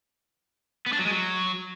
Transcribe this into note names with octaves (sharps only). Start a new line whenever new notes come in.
B3
D4
F#3
G#3
F#3